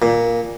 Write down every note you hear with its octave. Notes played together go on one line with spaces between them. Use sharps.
A#2